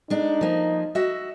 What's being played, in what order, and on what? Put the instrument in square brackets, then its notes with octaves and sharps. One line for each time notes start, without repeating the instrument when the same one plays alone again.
[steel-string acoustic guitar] G#3 D4 [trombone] D#4
[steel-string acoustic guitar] F3 A#3
F#4 D#5 E5